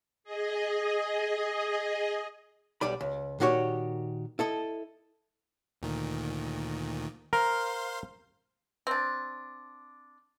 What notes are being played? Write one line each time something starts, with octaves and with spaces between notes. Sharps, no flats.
G#4 D#5
B1 G3 D5 B5
C#2
A#2 D#3 F#4 G4 C#5
E4 A4 D#5
D2 A#2 D#3
A#4 C5 F5 C6
C4 D4